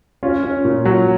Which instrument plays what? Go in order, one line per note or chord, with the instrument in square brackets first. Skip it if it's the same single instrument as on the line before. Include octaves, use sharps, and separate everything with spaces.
[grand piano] C#4 F4
C#4
A#2
F#3